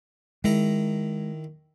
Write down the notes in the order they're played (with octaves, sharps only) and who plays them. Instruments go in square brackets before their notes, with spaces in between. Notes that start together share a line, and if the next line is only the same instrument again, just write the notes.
[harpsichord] D#3 E4 A#5 [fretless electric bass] G#3